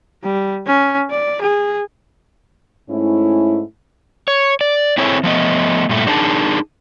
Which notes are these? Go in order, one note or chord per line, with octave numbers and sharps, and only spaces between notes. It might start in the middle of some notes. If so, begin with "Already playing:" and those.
G3
C#4
D5
G#4
G#2 A3 C#4 E4
C#5
D5
C4 E4 G#4 A4 C#5
F3 A3 B3 D#5
G2 A#2 A3
D4 D#4 G#4 A#4 A5